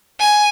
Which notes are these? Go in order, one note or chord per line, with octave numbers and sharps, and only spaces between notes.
G#5